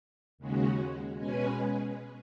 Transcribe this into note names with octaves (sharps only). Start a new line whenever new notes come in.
D#2 C#3 G#3 C#4 F#4
B2 G#3 C#4 G#4 B4